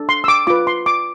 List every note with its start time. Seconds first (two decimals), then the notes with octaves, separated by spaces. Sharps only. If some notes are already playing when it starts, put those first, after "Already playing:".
Already playing: D4 A4
0.09 C6
0.24 E6
0.28 D6
0.47 F4 B4 D6
0.67 C6
0.86 D6